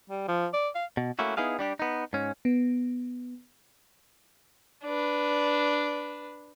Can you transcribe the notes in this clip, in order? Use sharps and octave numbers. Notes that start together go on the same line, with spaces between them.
G3
F3
D5
F5
B2
A3 A#3 C#4 E4 F#4
B3 D#4 E4 G#4 F5
G3 D4 G4
B3 D#4
G#2 C#4
B3
D4 B4